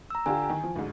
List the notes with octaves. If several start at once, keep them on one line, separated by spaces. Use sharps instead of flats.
A#5 E6
D3 F4 G4 G#5
D#3
F3
D2 G#2